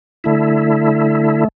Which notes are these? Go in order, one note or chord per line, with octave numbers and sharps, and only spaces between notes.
D3 A3 E4